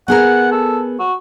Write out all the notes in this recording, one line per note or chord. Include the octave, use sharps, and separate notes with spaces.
B3 G#4 A#4 F#5
A4
F#4